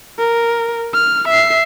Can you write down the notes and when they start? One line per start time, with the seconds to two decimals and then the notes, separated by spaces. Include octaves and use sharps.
0.19 A#4
0.94 F6
1.28 E5 C7